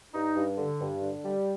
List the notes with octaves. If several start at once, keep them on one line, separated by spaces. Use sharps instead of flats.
G2 D#4
G2
D3
G2
D3
G3